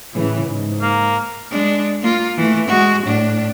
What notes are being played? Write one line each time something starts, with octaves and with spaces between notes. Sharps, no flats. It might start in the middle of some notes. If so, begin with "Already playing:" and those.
A2 C#3 E3
G#2
A#3
G#3 D4
A#3 F4
E3 A3
G#3 F#4
A2 D4